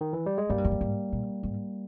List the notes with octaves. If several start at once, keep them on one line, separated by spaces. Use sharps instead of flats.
D#3
E3
G3
G#3
G#2 G3 A#3
G2
E2
G2
G#2
A#2
G#2